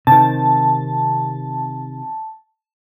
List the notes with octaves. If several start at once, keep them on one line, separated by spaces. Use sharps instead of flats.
C3 D#3 A5